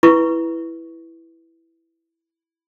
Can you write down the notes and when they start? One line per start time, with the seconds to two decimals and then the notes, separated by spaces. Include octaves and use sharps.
0.03 E4 B4 C#6